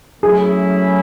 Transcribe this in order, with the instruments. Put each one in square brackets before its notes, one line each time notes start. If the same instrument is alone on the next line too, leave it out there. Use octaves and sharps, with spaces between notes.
[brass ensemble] F#3 A3 C#4 E4 [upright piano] G#4